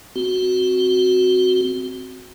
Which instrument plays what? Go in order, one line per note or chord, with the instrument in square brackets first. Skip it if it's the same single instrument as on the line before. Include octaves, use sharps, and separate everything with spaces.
[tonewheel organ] C4 F#4